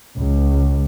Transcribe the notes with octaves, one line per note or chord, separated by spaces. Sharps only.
C#2